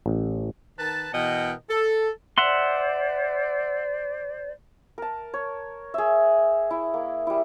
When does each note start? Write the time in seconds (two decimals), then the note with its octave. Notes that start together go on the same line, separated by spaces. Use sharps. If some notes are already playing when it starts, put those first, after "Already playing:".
0.06 A1
0.79 D#3 A#4 B4 A5
1.13 B2 E3 A#4 D#5 F#5 G5
1.70 A4
2.38 C5 D5 E5 F#5 C6
4.98 A#4 A5
5.34 C#5
5.94 G#4 E5
6.71 E4
6.94 A#3
7.27 G3 E4